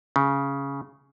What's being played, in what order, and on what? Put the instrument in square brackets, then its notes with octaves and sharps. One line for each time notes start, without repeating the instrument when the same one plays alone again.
[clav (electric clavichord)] C#3